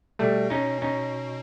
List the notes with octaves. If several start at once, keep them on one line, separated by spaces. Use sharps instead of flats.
B2 G3 A3
C#4 D#4
C#4 D#4